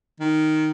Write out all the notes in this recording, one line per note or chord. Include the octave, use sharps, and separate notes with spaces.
D#3